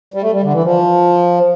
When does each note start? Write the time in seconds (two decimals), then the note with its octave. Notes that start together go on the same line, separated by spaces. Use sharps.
0.14 G3
0.22 A3
0.32 G3
0.43 D3
0.53 E3
0.64 F3